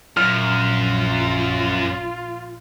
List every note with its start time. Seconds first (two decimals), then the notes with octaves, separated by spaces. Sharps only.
0.17 A#1 F#2 F4 F6